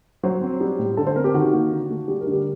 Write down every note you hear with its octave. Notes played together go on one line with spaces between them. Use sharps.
F#3 C5
C4
G3
A2
D3 A4
C5
C4 A#4
G4
D#3 F#4
A#3
D3
A3
G3 G4
A#4
D3
G4